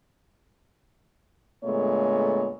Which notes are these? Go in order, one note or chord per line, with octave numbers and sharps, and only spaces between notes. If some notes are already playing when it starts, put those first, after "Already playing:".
A#2 D3 G#3 A3 B3 C#5